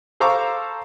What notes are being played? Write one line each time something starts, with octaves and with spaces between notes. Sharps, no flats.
A4 C5 F5 A#5 C#6 D6